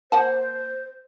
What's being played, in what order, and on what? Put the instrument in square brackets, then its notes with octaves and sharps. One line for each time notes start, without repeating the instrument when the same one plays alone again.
[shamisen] A#3 F#5 A5 [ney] C5